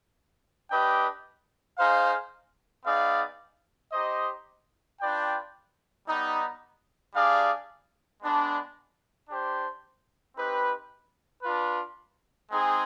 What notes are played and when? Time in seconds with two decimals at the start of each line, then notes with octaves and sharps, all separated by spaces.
0.71 D4 G4 B4 D#5 G5
1.78 D#4 G#4 C5 F5
2.85 B3 D#4 G#4 D5 F5
3.93 D#4 G4 C5 D#5
5.00 D4 F4 B4 D5 G5
6.07 G3 B3 D#4
7.14 G3 D4 G#4 D5 F5
8.21 G#3 B3 D4
9.29 D4 G4 C5
10.36 C4 D#4 G4 B4
11.43 D4 F4 B4
12.51 G#3 C4 D#4 G#4